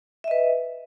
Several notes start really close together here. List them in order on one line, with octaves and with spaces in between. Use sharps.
E5 D#5 B4